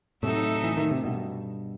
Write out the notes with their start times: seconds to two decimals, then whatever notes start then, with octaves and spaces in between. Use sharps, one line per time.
0.23 A2 C3 F#3 A3 D#4 A4 E5
0.64 E3
0.77 D#3
0.91 C3
1.04 G2 B2